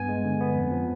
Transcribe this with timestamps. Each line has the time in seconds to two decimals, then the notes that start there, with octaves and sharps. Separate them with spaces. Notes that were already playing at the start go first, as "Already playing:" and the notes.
Already playing: G2 B3 G#5
0.08 G#3
0.25 D3
0.40 B3
0.56 F2
0.72 F3